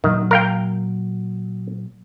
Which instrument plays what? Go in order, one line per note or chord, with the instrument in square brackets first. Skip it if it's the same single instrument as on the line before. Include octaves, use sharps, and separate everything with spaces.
[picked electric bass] A#2 F#3 [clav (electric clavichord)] D#3
[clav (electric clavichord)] A#4 F5 G5